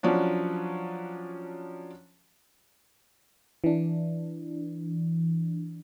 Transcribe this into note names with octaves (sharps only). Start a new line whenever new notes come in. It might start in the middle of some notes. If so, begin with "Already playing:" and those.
F3 F#3 C#4 D4
E3 D4